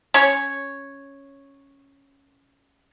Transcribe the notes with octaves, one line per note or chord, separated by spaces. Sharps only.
C#4 C#5